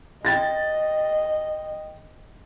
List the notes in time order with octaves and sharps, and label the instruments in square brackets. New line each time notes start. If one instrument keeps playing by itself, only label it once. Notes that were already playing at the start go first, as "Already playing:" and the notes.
[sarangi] D#5 [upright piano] G5 A6 A#6